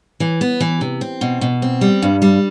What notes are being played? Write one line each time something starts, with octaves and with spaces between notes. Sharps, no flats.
E3
B3
E3
C3
C4
B2
B2
C4
G3
G2
G3